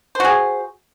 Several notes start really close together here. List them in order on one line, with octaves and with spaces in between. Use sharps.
C5 F#4 G#4